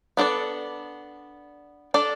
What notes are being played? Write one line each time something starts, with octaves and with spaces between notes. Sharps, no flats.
B3 D4 A4 D5
D4 A4 D5